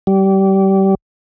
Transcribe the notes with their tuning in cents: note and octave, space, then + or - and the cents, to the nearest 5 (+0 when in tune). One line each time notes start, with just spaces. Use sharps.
G3 -25